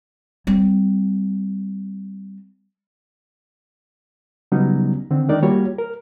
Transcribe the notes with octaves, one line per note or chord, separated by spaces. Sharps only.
G3 C4
C#3 F#3 G3 B3 C#4 D#4
D3 D#3 C4
D#3 G#3 D4 D#4 A#4 D5
G3 A#3 F4 F#4 C#5
A#4